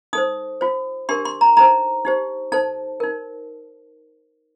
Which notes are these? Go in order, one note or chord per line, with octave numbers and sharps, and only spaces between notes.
D#4 A4 C5 D#6
F4 C5
D4 G4 A#4 C6
C6
A#5
D#4 A4 C5 A#5
D#4 G4 C5
D#4 A4 C5 A5
D#4 A#4